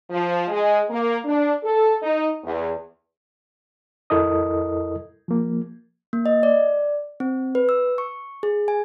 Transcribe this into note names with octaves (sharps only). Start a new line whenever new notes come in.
F3
G#3
A#3
D4
A4
D#4
E2
F2 E4 A4 A#4 D#5 D#6
F3 A#3
A#3
D#5
D5
C4
B4
E6
C#6
G#4
G#5